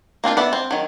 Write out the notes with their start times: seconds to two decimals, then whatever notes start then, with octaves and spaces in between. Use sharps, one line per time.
0.24 A#3 C4 D4 F4
0.37 B3 D5 E5
0.53 C4
0.71 D#3 F#3